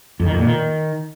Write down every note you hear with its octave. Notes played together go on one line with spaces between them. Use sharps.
F2
D#3
F2
A#2
D#3